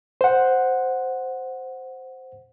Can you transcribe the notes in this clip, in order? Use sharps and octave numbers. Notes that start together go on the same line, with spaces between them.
C5 F#5